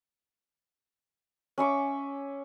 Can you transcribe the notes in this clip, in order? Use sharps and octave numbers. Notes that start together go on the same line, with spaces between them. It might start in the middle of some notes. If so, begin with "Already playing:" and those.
C#4 E5 C#6 D6